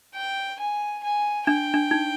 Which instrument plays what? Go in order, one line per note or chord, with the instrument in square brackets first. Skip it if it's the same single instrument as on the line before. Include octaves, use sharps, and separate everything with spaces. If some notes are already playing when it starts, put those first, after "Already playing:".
[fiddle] G5
G#5
G#5
[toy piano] D4 [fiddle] G5
[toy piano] D4
D#4